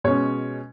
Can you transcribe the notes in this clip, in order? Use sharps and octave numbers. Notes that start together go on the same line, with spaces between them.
B2 G#3 C#4 C#5